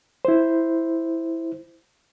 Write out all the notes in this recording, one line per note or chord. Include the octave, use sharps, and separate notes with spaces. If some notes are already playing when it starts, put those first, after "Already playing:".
E4 C5